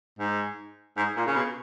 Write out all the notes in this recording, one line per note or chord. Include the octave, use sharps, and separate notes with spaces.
G#2
G#2
A#2
C#3
B2